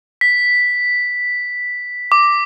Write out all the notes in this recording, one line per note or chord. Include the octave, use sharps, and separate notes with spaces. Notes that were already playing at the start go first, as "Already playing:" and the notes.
B6
D6